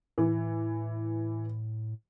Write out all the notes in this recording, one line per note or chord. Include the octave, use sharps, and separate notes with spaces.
A2 E3